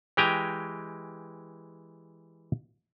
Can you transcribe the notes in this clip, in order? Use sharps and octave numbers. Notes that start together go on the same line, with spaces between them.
E3 G#3 G4 G5 G#5 A#5